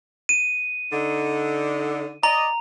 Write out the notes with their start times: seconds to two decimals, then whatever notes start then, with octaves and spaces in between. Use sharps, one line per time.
0.29 D#7
0.92 D3 D#4
2.23 D5 D#5 A#5